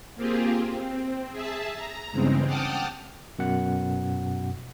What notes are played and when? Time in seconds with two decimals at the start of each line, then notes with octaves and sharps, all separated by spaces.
0.16 A#3 C4 F4 G4 G#4
0.55 C4
1.32 G#4 E5 A5
1.75 A#5
2.11 E2 G2 C#3 G#3 C4
2.46 F#5 G5 A5 D6 D#6 F6
3.39 F#2 B2 F#5